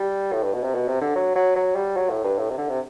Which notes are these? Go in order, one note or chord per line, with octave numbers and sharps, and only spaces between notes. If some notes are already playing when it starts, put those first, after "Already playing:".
Already playing: G3
A2
G2
B2
C3
B2
C3
D3
F#3
F#3
F#3
G3
F#3
A2
G2
A2
C3
D3
C3